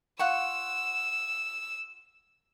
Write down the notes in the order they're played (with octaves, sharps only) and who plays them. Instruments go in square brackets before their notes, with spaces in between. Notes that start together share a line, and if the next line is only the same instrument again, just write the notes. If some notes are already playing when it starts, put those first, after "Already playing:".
[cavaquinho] F4 F#5 C#6 [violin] E6